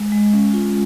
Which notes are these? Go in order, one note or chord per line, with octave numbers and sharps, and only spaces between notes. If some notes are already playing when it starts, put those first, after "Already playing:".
Already playing: G#3
G#3
C#4
F4